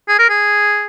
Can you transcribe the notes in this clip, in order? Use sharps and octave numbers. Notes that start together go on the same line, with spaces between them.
G#4
A#4
G#4